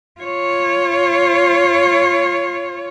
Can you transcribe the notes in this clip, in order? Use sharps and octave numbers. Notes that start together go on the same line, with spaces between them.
F4 C#5